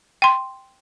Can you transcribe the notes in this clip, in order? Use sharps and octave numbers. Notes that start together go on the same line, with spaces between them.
G5 C6